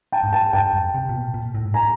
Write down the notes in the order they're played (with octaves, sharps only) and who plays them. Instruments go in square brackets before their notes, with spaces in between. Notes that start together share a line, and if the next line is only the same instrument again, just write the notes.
[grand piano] G5 A5
[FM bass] G#2
[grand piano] G5 A5
[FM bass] G2 [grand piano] G5 A5
[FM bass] F#2
C3
A#2
B2
A#2
A2
G#2
[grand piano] G#5 A#5